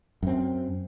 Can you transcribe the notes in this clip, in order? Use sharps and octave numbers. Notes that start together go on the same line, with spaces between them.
F#2 C4